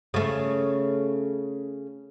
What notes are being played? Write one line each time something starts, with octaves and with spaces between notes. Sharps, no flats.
C#3 A3